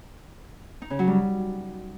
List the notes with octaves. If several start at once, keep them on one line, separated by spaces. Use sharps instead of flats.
D#4
C#3
F#3
G3